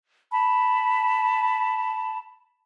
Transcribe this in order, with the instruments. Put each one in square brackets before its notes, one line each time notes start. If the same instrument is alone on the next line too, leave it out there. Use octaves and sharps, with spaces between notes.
[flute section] A5 B5